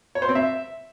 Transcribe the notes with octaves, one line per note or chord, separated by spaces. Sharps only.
C#5
C5
C4
E5